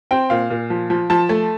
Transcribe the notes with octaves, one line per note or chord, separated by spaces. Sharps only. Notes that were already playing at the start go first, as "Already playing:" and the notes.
C4 G5
A#2 F5
A#2
F3
F3
F3 A5
A3